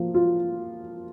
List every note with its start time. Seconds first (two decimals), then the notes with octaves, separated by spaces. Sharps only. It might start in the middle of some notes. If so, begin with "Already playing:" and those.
Already playing: F3 A#3
0.14 F4